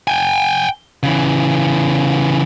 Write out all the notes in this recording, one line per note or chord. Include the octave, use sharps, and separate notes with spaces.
G5 G#5
C#3 E3